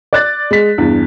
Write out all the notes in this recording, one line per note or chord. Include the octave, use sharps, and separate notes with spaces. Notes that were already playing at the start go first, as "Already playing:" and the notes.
D5 F#6 A6
G#3 B6
E2 G2